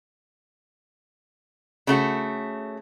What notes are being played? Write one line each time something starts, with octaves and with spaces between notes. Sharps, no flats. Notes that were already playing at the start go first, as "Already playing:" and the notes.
C#3 A3 F#4